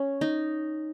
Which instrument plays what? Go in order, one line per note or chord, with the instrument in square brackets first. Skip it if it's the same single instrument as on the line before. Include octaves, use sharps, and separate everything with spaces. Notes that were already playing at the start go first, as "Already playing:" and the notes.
Already playing: [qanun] C#4
D#4